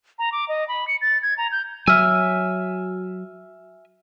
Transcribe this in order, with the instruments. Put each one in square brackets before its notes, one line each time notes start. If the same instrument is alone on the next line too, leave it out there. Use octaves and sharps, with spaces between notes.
[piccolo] A#5
D6
D#5
B5
C#7
A6
G#6
A#5
G6
[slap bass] F#3 [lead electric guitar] E5 G#5 [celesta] E6 F6